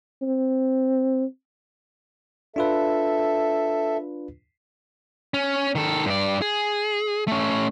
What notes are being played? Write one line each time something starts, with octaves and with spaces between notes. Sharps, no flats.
C4
D4 F4 A4 B4 E5
C#4
D#3 A4
G2 D5
G#4
A3 C#4